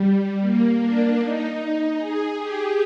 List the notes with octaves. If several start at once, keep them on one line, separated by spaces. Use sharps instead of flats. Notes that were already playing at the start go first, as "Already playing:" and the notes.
Already playing: G3
A#3
D4
D#4
G#4
G4